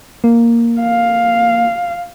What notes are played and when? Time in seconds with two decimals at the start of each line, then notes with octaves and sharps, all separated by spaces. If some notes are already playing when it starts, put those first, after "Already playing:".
0.24 A#3
0.81 F5